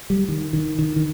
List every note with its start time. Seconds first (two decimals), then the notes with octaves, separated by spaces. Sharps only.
0.10 G3
0.28 D#3
0.53 D#3
0.79 D#3
0.96 D#3